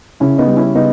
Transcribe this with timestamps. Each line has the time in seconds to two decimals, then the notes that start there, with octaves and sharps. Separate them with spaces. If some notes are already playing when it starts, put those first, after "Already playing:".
0.20 C#3 C#4 E4
0.38 B3 D#4
0.47 G3
0.57 C#4 E4
0.75 C#3 B3 D#4